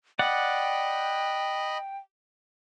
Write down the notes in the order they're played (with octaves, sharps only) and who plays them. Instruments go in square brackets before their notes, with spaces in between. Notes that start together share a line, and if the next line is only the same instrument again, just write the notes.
[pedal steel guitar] D5 F#5 [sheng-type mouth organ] D#5 B5 [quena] G5